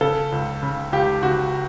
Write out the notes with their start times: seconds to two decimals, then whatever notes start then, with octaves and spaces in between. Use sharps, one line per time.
0.01 C#3 A4
0.32 C#2
0.63 C#3
0.92 C#2 G4
1.23 C#3 F#4